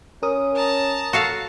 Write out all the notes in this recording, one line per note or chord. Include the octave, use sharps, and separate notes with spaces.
C#4 A#4 D#6
A5 A#5
F#4 A4 F5